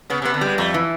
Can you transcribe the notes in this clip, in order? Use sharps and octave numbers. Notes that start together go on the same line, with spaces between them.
C#3 B3
C3
B3
D3
G3 G#3
F2 A3
E3